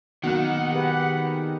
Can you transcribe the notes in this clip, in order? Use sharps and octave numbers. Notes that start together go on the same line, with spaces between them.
D#3 F#3 A#3 B3 F#5 F#6
G4 G#4 B4